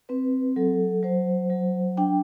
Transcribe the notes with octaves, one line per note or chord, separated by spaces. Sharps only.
C4 B4
F#3 A4
F#3 C5
F#3
D4 G5